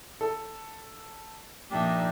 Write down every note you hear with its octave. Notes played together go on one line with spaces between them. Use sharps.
A4
A#2 F3 D4 D#4 G4 E5